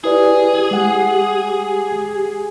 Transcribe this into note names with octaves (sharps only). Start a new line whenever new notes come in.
E4 G4 G#4 B4 D5
G#3 F#5 G#5